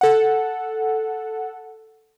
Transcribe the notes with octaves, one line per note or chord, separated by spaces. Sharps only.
A4 F#5